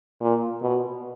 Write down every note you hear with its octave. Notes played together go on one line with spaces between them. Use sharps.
A#2
B2